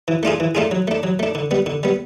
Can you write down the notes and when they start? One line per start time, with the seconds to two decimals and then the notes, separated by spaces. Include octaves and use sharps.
0.08 E3
0.23 A3 D4 F4 G#4
0.40 E3
0.55 A3 D4 F4 G#4
0.71 F#3
0.88 A3 D4
1.03 F#3
1.19 A3 D4
1.35 D3
1.51 G3 B3
1.66 D3
1.83 G3 B3